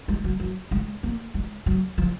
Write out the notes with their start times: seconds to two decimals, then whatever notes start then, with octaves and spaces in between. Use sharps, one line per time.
0.08 G#3
0.24 F#3
0.40 F#3
0.71 G#3
1.03 A#3
1.34 G#3
1.66 F#3
1.98 F3